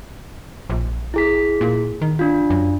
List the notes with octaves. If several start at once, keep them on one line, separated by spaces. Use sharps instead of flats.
A#1
E4 G#4 B6
A#2
D#3
D4 F4
F#2